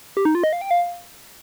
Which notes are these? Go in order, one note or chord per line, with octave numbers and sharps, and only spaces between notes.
G4
D#4
F4
D#5
F5
G5
F5